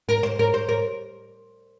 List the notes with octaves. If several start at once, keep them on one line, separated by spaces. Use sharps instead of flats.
A#4
C5
A#4
C5
A#4